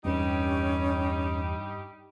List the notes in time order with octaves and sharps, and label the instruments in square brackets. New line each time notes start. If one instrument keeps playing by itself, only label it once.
[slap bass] E2 C4 [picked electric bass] G2 [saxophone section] G3 D#4 G4 [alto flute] C#4